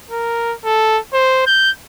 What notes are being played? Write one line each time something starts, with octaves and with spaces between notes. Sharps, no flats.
A#4
A4
C5
G6